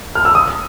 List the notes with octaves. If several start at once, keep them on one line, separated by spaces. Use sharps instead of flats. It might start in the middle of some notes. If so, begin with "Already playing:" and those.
F6
E6
D#6